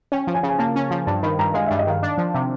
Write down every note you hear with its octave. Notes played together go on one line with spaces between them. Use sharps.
C#4 G5
F3
G#5
C#3
G#5
A#3 A5
C#4
F3
G2 A5
D#3 B5
G2 A#5
G#3 F5
G2 E5
D#5
D#3 F5
D4
F3
C3